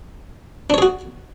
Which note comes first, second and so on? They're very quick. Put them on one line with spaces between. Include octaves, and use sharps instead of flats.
D4 C#5 G#4 F#4